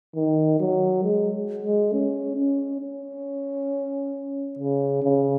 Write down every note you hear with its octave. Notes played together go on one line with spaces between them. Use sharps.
D#3
F#3
G#3
G#3
C#4
C#4
C#4
C#3
C#3